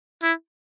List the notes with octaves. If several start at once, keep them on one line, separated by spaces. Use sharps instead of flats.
E4